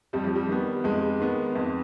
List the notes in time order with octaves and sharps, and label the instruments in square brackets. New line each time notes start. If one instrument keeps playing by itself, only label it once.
[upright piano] F2 [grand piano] G3
[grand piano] F3
G3
[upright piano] D#3 B3
[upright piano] F2 [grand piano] G#3
[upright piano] D#3 B3
F2